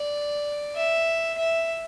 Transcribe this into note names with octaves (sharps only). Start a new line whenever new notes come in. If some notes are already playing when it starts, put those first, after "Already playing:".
Already playing: D5
E5
E5